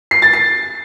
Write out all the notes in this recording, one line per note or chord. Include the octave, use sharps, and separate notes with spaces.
C7
A6
C7